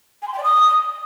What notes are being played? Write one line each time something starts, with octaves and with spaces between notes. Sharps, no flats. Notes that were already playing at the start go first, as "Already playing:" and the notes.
G#5
C6
G5
D5
D#6